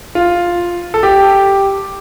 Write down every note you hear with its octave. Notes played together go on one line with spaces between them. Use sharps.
F4
A4
G4